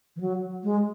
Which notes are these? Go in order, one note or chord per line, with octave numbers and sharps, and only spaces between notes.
E3
F#3
G#3